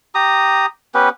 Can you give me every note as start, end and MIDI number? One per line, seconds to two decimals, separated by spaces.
0.15 0.66 67
0.15 0.66 82
0.15 0.66 87
0.95 1.09 59
0.95 1.09 61
0.95 1.09 67
0.95 1.09 71